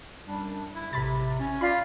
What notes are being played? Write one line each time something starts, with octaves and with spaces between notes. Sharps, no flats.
F#2 G3 D4
E4
A1 C3 B5 A6
C#4
F4 D5 B5